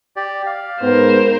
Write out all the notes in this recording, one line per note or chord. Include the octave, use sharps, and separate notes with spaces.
G4 D5
F5
G#2 B3 A#4 C5